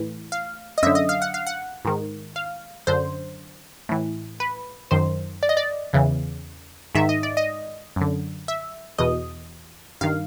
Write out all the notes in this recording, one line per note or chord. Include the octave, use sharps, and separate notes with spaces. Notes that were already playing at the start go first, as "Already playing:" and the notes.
Already playing: A2 E3
F5
D#5
F#2 D3 E5
D#5
F5
F#5
F5
F#5
G#2 D#3
F5
F#2 D3 C5
A2 E3
B4
F#2 D#3 C5
D5
D#5
D5
E2 C#3 E3
G#2 D#3 E5
D#5
D5
D#5
F#2 D3
E5
E2 B2 D#5
G2 D#3 F5